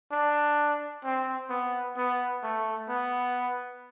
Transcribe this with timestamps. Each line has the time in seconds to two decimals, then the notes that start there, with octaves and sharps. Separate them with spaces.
0.11 D4
1.04 C4
1.49 B3
1.97 B3
2.43 A3
2.89 B3